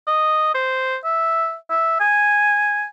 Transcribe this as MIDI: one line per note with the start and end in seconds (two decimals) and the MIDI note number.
0.07 0.51 75
0.55 0.97 72
1.04 1.55 76
1.70 2.00 76
2.00 2.85 80